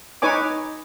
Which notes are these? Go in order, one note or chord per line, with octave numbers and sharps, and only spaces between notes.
D#4 B4 C#5 G#5 D6